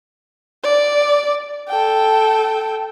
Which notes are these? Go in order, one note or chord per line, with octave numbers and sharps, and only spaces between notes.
D5
A4 G5